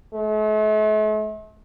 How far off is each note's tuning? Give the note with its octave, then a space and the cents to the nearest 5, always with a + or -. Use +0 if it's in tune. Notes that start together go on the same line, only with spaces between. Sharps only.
A3 -45